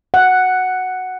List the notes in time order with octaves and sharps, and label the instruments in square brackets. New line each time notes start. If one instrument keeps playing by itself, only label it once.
[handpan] F#5